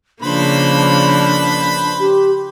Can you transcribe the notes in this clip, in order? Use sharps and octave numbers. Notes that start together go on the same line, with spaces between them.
C#3 F3 A#3 D4 B4 C5 B5
G4